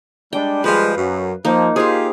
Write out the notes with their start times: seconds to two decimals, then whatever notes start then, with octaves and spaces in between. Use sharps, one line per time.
0.33 G3 G#3 D4 G5
0.64 F3 G3 G#3 B4 F5
0.97 F#2
1.45 F3 A#3 D#4
1.76 F4 G4 G#4 C5